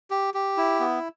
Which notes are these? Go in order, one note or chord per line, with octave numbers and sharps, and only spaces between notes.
G4
G4
E4
B3